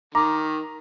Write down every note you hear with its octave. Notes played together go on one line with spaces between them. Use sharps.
D#3 A#5 D6